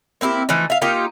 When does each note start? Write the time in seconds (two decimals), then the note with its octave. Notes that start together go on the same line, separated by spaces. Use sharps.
0.21 A#3 C4 E4 G4
0.49 E3 F3 A3 D#4
0.70 E5 F5
0.82 A#3 D#4 F4 G4